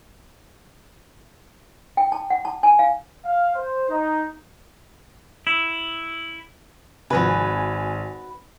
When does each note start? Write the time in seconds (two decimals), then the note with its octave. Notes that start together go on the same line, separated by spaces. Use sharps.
1.97 G5
2.12 A5
2.30 F#5
2.45 A5
2.63 G#5
2.79 F5
3.25 F5
3.55 C5
3.90 D#4
5.47 E4
7.10 G#1 C3 F3 F#4 B4 G#5